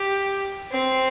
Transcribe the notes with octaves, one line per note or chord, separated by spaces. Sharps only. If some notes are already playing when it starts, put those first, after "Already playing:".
Already playing: G4
C4